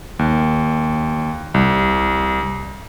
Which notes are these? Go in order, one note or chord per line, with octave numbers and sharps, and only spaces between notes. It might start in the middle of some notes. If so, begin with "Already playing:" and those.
D#2
C2